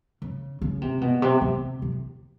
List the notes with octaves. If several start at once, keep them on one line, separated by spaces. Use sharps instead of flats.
C#3
C#3
C3
B2
C3
C3
C3